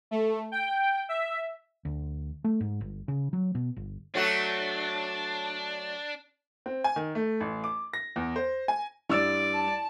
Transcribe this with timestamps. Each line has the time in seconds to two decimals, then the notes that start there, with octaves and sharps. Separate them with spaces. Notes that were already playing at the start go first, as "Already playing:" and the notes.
0.11 A3
0.52 G5
1.09 E5
1.85 D2
2.44 A3
2.61 G#2
2.81 G1
3.08 C#3
3.33 F#3
3.55 B2
3.77 G1
4.15 F#3 A3 D4 F#4
6.66 C4
6.84 G#5
6.96 D#3
7.15 A3
7.41 A1
7.64 D6
7.93 A#6
8.16 E2
8.36 C5
8.68 G#5
9.10 G2 E4 D5 E6
9.55 A5